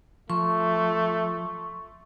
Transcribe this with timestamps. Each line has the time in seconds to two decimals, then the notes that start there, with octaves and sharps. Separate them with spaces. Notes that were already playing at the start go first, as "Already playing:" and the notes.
0.30 F3 A3 C6 C#6